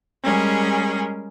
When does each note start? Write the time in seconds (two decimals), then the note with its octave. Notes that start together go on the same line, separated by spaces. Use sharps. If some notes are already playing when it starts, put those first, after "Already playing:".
0.23 G3 G#3 C#4 G#4 A#4